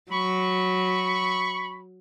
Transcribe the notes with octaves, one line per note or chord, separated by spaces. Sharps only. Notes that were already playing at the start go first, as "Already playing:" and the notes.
F#3 B5 C#6